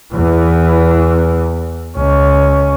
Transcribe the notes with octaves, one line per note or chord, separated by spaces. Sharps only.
E2 E3
C#2 C#4